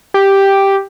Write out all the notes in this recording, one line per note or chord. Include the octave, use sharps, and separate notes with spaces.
G4